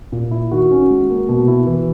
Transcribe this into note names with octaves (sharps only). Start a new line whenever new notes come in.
A#2
E4
D#3 F#4
C#4
G#3
A#3
B2
E4
E3